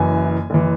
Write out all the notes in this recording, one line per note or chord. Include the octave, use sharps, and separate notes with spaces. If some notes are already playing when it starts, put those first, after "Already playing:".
Already playing: F#1 F#2 E3 G#5
F#1 E3